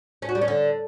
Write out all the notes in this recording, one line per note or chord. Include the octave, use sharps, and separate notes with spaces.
C#4
F#4
G3
C#4
D3